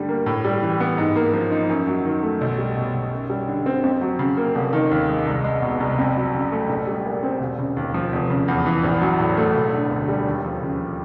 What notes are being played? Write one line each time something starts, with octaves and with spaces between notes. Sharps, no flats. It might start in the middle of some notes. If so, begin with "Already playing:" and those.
Already playing: G2 D3 G3 A3
A#3
A2
G3
E3
B3
G#2
A#3
F3
D#4
F#2
F#3
D#3
A3
B1
G3
B2
B1
F#2
G3
D3
C4
F2
F#3
C#3
A#3
F1
D#3
D#2
G#3
C2
G#3
B2
C2
F2
F#3
C#3
A3
A#1
G3
A#2
C4
E1
C#3
D#2
F3
F1
C#3
E2
E3
A#1
F#3
A2
A3
E1
D3
D2
G3
D#2
F3
C#3